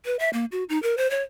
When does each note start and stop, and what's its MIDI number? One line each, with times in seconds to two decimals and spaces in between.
0.05 0.16 71
0.19 0.30 76
0.33 0.45 58
0.52 0.64 66
0.69 0.81 63
0.83 0.95 70
0.98 1.10 72
1.10 1.22 73